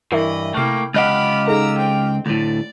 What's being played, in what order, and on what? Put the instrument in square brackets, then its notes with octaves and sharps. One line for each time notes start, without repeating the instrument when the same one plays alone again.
[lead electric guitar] G2 E3 [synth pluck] E4 A#4 E5 [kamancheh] D#5 B5
[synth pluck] C3 F6 [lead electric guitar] A3 A#3 [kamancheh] E4 G5
[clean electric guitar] C#2 D#5 F#5 [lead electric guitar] F4 G4 [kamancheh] B5 F6 [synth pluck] F#6
[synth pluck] D#4 G#4 A4 [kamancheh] A#5 E6
[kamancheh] C4 G5
[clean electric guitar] D2 A2 [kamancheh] D5